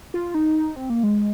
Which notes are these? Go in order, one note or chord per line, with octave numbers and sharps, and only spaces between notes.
F4
D#4
C4
A#3
G#3